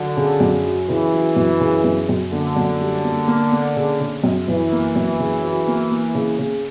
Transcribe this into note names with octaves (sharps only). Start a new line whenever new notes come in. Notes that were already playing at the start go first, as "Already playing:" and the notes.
Already playing: D3 F#3
C#3
F#2
F#3
C#3 E3
F#3
F#2
C#3
F#2
F#2
D3 A#3
F#2
G3
A#3
A#3
A#3
C#3
C#3
F#2
F#2 E3
A#3
F#2
C#3
F#3
A#3
A#3
C#3
C#3